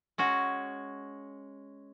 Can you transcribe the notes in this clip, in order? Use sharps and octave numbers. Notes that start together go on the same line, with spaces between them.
G#3 C#4 F#4